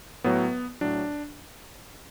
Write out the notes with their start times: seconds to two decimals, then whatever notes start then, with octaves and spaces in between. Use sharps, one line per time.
0.24 A2 F#3 B3
0.81 A2 F#3 D4